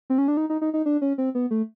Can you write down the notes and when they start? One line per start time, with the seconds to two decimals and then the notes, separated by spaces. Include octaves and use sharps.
0.10 C4
0.18 C#4
0.28 D4
0.37 D#4
0.50 D#4
0.61 D#4
0.74 D#4
0.86 D4
1.02 C#4
1.18 C4
1.35 B3
1.51 A3